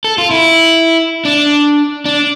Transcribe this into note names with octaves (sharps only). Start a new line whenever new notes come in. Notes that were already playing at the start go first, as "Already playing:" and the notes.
A4
F4
E4
D4
D4